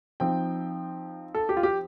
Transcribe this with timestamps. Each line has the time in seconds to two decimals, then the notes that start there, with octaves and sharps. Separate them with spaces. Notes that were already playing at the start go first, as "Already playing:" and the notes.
0.20 F3 C4 D#4 G5
1.35 A4
1.49 G4
1.57 F4
1.63 G4